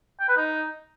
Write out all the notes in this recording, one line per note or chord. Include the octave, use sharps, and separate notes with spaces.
G5
B4
D#4